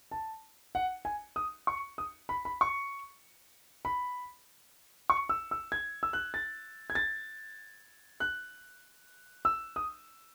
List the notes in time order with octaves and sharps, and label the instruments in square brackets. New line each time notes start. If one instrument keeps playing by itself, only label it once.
[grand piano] A5
F#5
G#5
D#6
C#6
D#6
B5
B5
C#6
B5
C#6
E6
E6
G#6
E6
F#6
A6
G#6
A6
F#6
E6
D#6